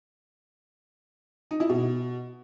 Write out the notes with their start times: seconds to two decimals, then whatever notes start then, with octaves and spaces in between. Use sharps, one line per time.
1.51 D#4
1.60 E4
1.69 B2